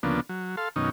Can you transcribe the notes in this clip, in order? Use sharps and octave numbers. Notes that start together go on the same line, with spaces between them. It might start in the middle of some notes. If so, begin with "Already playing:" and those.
D2 C#3 F3 A#3 B3 D4
F#3
A4 F5 C6
F#2 B2 D#3 C#4 D#4